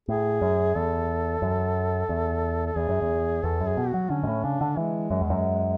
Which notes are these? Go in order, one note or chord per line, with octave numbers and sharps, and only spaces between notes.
A2 G#4
F#2
E2 A4
F#2
E2
A4
E2 G#4
F#2
E2
E2 A4
F#2
G#4
B2
F#4
F#3
D3 C#4
G#2
A2
C#3 D4
D3
E3 G#3
F#2
E2
F#2